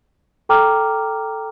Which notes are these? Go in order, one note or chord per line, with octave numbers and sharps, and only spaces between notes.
A4 G5 A#5 D6 F6